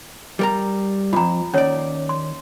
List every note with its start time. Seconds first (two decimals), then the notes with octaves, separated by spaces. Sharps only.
0.39 G3 A#4 A#5
1.13 F2 G#2 F4 A#5
1.54 D#2 C#4 C#5 D5
2.09 C6